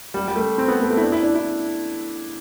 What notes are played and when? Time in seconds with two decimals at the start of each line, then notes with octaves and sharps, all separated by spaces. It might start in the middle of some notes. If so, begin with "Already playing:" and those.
0.14 G3
0.28 G3
0.36 A3
0.58 C4
0.68 B3
0.80 A3
0.90 A3
0.97 E4
1.02 D4
1.12 E4
1.22 D4
1.35 E4